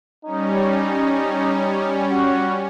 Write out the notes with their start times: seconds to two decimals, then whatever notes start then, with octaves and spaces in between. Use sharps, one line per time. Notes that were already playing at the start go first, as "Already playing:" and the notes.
0.24 G3 C#4 D#4
2.11 F#4